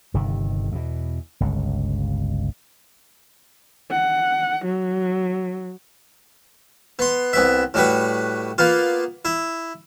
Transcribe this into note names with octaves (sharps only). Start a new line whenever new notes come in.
G1 C3 D#3
E2 B2
G1 C#2
F#5
F#3
B3 C6
C2 B3 E5
A2 G3 F#4 B4
A#3 B3 F4
E4